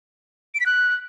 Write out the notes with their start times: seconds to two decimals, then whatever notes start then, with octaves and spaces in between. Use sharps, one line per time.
0.55 D7
0.60 B6
0.66 F#6